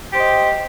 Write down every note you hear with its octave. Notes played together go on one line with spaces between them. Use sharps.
G4 C5 D#5